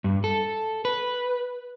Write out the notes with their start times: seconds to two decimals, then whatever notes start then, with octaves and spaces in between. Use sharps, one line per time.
0.04 G2
0.24 A4
0.85 B4